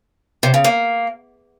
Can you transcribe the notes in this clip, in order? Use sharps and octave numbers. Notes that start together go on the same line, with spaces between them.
C3
C#3
A#3